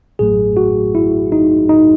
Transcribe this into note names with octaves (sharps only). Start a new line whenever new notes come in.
A1 A2 F#3 A3 G#4
F#4
E4
D#4
D#4